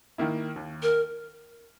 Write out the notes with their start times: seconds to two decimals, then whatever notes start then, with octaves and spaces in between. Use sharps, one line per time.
0.18 D#3 A#3 E4
0.56 D#2
0.83 A#4